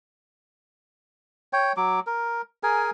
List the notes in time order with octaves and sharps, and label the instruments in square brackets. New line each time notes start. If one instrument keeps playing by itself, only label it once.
[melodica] C#5 G5
F#3 D6
A#4
G#4 A#4 G#5